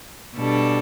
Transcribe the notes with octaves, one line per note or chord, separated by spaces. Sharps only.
B2 G3 D4 A4